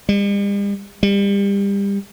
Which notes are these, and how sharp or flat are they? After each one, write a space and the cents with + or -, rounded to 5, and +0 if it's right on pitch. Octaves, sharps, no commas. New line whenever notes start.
G3 +45
G3 +30